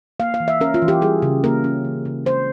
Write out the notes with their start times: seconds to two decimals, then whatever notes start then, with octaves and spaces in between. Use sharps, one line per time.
0.20 A#3 F5
0.34 F5
0.40 E3
0.48 E5
0.61 C#4 A#4
0.74 F4
0.82 E3
0.88 G4
1.02 G3 G#4
1.22 C#3
1.44 A#3 A#4
1.64 C#4
1.85 E3
2.05 C#3
2.26 G#3 C5